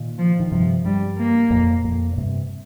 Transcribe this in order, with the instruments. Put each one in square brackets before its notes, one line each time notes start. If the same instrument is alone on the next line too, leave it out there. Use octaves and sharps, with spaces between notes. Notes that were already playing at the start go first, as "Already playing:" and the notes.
Already playing: [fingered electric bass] A#2 D#3
[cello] F3
[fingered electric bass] D#3
[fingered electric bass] G2 C3 [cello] F3
[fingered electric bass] G2 [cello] G3
[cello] A#3
[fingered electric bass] F2 A#2
F2 A#2
A#2
G2 C3